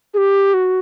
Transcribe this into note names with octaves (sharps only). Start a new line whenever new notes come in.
G#4
G4
F#4